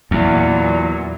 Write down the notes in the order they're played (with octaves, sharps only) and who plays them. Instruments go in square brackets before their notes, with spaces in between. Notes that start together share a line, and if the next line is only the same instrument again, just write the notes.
[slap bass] E2 [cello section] A#2 F#3